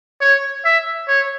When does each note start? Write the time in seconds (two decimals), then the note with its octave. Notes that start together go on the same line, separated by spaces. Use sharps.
0.21 C#5
0.65 E5
1.08 C#5